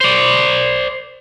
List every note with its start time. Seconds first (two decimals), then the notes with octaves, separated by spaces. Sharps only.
0.01 C5 D5